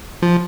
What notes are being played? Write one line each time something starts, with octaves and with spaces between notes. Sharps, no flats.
F3